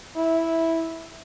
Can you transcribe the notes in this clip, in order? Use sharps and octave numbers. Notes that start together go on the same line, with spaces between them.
E4